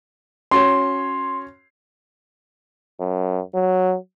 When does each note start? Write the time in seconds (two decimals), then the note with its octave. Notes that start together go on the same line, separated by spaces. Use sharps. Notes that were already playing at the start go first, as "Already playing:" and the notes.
0.51 C#4 F#4 C#5 C6
3.00 F#2
3.55 F#3